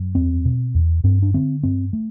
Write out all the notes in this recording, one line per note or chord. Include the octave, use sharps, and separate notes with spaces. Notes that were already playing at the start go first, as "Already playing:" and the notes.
Already playing: F#2
E2 C4
B2
E2
G2 C4
D4
D3 C4
G2 C4
A3